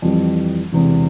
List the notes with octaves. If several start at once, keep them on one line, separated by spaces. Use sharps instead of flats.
F2 E3 G3
E1 E2 C3